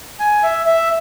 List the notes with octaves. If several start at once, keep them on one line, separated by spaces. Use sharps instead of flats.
G#5
E5
E5